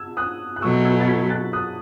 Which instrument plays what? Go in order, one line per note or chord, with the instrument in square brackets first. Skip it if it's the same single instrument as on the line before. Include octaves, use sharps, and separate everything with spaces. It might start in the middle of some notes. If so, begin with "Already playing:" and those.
Already playing: [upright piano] E6 G#6
D#6 F#6
F#6
[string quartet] B2 F#3 A3 [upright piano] C#6 E6
[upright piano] E6 G#6
A6
G#6 B6
F#6 A6
D#6 F#6